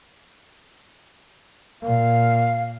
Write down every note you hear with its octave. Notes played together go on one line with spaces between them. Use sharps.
A#2 F5